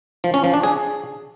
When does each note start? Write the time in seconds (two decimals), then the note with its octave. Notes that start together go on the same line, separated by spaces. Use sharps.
0.24 F3
0.34 C#4
0.44 F3
0.54 D4
0.63 G#4